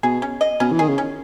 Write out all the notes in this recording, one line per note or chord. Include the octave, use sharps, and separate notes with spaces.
B2 G#4
C#4
D#5
B2 C#4
E3
D#3 G#4
C#3
C#4